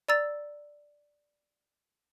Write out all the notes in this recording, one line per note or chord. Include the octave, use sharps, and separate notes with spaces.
D5 A#5 E6 A6